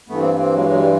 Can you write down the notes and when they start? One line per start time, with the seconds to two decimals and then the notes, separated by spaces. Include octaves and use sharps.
0.09 G2 E3 A3 B3
0.19 A#3 C4
0.39 A#3 C4
0.54 F#3 G#3
0.68 F#3 G#3
0.78 G3